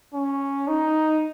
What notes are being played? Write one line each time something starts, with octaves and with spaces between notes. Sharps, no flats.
C#4
D#4